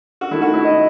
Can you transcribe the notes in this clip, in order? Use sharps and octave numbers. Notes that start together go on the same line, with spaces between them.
F#4
D#3 A3 E4
F#4
E4
D#5